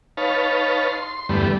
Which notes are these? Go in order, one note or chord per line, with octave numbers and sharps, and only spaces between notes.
D#4 B4 C#5 F5 A5
C6
E2 G2 D3 G3 A3 B3